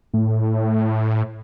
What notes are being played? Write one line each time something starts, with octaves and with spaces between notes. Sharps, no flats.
A2